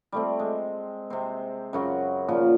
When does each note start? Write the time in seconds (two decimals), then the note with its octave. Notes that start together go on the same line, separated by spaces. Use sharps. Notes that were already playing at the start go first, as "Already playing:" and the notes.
0.12 G3 A3 C4
0.39 G#3
1.10 C3 C4
1.73 F#2 C#3 F#4
2.28 A#2 C#3 F3